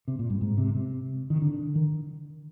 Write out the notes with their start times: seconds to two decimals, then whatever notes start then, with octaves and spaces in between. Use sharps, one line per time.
0.08 C3
0.19 A#2
0.30 G2
0.41 G#2
0.58 C3
0.75 C3
1.30 D#3
1.42 D3
1.75 D#3